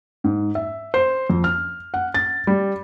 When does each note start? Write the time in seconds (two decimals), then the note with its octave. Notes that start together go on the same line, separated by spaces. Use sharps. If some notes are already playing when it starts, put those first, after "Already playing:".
0.24 G#2
0.55 E5
0.94 C5
1.30 F2
1.44 F6
1.94 F#5
2.14 A6
2.47 G3